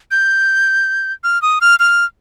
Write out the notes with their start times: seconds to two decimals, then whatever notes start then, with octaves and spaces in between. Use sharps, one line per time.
0.11 G6
1.24 F6
1.42 D#6
1.61 F6
1.80 F6